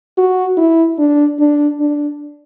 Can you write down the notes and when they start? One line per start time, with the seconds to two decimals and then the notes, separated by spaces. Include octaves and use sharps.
0.18 F#4
0.58 E4
0.99 D4
1.39 D4
1.80 D4